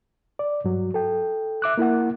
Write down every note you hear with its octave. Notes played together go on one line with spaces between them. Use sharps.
D5
G2 F#3
A4 G5
E5 D6 F#6
A#3 E4 A#4 F#5